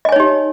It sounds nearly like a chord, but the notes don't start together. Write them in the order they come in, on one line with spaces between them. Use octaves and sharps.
D#5 G#5 C#5 D#4 G4